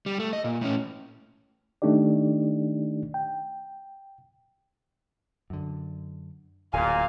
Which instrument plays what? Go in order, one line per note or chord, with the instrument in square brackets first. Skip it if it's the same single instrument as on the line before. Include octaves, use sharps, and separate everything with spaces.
[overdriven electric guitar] G3
A3
D#5
A#2
A2 C#4
[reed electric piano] D#3 A3 D4 D#4 G4 D5
G5
[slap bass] F#2 D3
[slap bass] D1 [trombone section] A#2 [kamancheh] F5 [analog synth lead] G#5